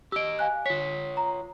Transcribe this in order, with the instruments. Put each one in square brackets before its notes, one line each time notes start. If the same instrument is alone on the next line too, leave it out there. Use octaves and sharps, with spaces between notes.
[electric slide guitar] G4 D#5 [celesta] E6 D7
[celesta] F5 G#5 F#6
[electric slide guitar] F4 C#5 [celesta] B6
[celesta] A#5